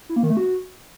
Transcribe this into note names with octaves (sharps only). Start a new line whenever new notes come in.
E4
A#3
D#3
A3
F#4